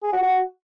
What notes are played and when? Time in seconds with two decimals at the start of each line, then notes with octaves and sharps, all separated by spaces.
0.03 G#4
0.13 F#4
0.23 F#4